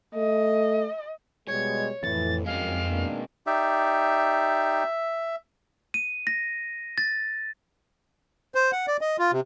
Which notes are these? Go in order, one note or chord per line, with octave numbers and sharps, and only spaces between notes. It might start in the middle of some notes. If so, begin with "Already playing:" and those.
A3 D#5
B2 G3 G#3 C#5 G#6
F2 A2 E3 A6
F#2 G#3 C4 F5
B2 A#3 D4
D#4 G4 D5 E5
D#7
A#6
A6
C5
F#5
D5
D#5
F4
C3